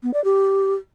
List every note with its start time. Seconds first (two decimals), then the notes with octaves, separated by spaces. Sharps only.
0.03 B3
0.14 D5
0.24 G4